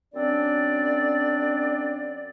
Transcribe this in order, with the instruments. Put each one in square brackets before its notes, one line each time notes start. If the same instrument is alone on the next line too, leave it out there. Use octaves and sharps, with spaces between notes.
[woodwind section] F#2 C4 D4 D5